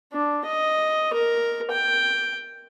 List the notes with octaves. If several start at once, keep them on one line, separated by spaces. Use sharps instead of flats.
D4
D#5
A#4
G5